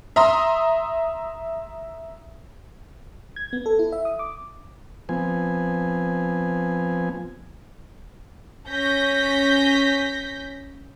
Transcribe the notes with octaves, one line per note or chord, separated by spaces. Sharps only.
E5 A#5 C6 D#6
G#6
B3
A4
E4
E5
D#6
D6
F3 B3 C4 G#5
C#4 G6 A#6 B6